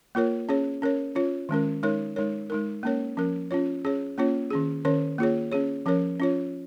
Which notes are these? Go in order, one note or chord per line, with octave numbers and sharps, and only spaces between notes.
A#3 F4 A#4 C#5
C#4 G#4 C#5
C#4 A#4 C#5
C#4 F4 C#5
D#3 G#3 C#4 A#4
G#3 D#4 A#4 C#5
G#3 D#4 A#4 C#5
G#3 D#4 A#4
A#3 C#4 A#4 C#5
F3 C#4 A#4
C#4 F4 C#5
C#4 G#4 C#5
A#3 C#4 F4 C#5
D#3 C#4 G#4
D#3 C#4 A#4 C#5
A#3 F4 G#4 C#5
C#4 G#4 C#5
F3 C#4 A#4 C#5
C#4 F4 C#5